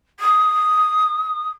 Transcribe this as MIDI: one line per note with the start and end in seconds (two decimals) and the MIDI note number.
0.19 1.47 87